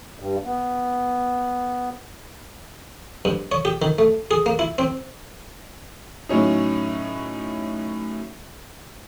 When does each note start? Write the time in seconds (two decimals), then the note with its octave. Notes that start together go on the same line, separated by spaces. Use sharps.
0.20 G2
0.45 B3
3.25 G2
3.52 C#5
3.65 G4
3.82 D#3
3.98 A3
4.31 G#4
4.46 A#3
4.59 E4
4.78 C4
6.29 A2 F#3 C#4 D#4